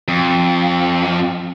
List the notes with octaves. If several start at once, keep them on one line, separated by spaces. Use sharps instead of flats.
F2